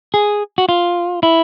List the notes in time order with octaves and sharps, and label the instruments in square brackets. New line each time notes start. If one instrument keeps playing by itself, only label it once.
[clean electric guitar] G#4
F#4
F4
E4